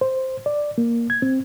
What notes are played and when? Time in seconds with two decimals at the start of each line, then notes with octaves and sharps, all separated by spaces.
0.01 C5
0.46 D5
0.78 A#3
1.10 G#6
1.22 C4